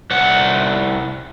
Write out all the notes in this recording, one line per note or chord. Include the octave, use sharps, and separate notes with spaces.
C2 F#5